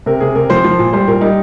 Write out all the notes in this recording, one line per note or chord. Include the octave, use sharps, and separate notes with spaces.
C3 A#4
C3 G#4
C3 A#4
F3 C5
F3
A#2
G3 C5
A#2 A#4
G3 D#4